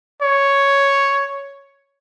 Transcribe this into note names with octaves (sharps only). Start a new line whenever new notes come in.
C#5